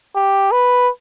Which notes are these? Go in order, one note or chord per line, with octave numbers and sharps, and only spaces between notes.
G4
B4